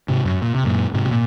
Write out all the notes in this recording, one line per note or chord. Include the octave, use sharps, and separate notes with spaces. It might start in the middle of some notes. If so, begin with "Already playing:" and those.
G#2 C3
F#2
A#2
C3
F#2 A#2
G#2 C3
C3
A#2